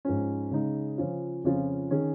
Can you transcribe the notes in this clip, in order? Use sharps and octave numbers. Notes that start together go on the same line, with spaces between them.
G#2 F3 C#4
C#3 G#3 D#4
C#3 F3 C#4 F4
F2 C#3 F3 C#4 F4
D#3 C#4 G#4